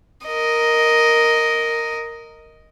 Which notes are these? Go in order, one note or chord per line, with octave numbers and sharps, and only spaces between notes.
A#4 D#5